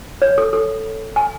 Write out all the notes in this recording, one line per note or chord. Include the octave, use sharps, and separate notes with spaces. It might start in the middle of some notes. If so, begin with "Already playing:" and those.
C#5
A4
A4
G#5